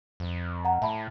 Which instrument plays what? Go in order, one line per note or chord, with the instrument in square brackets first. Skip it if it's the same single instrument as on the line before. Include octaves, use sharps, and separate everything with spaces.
[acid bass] F2
[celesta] F#5 A#5
[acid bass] A2 [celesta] E5 A5 B5